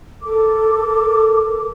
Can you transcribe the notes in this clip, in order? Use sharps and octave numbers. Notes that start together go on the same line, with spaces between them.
A4 A#4 D6